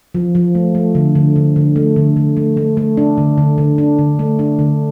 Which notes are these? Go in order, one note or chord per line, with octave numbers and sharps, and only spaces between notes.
F3
F3
A3
A3
D3
D3
D3
D3
A3
D3
D3
A3
A3
A3
D4
D3
D3
D3
D4
D3
A3
D4
D3